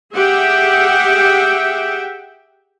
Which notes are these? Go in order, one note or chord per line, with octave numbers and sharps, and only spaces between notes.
G4 G#4 E5 F#5 G5